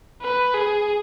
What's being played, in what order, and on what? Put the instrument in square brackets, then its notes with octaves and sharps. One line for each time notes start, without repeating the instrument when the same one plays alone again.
[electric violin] B4
G#4